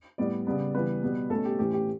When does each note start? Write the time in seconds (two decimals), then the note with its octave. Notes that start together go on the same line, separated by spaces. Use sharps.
0.18 A2 G3 B3 D5
0.47 C#3 G3 B3
0.74 C#3 E3 G3 B3 B4
1.03 B2 G3 B3
1.30 B2 A3 C#4 A4
1.45 G4
1.59 A2 E3 A3 C#4 G4
1.73 G4